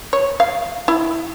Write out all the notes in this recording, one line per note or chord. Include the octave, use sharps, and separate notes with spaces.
C#5
F5
E4